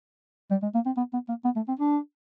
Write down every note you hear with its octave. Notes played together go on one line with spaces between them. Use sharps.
G3
G#3
A#3
C4
B3
B3
A#3
B3
A3
C4
D4